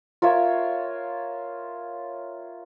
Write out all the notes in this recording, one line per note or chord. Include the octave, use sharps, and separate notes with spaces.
F4 A#4 C#5 E5